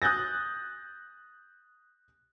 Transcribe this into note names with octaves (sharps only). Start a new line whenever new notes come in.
D#6 F#6 G6 A6 A#6